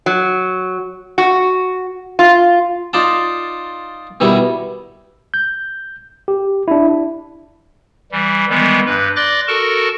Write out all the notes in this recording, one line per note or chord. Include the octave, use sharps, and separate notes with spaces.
F#3
F#4
F4
D#4 F4 D5 F5 A5
B2 D#3 G3 E4
G6
G4
D4 E4
E3 G3
D#3 E3 G3 G#3 B3
G2 B4
D5 C6 D6 F#6 A6 A#6
F#4 A4 A#4 A5 C#6